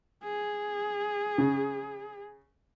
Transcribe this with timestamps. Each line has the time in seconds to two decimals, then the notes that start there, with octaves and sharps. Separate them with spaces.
0.24 G#4
1.38 C#3